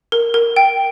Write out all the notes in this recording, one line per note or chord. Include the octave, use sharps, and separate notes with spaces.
A#4
A#4
G5